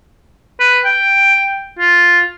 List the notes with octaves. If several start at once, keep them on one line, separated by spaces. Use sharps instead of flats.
B4
G5
F4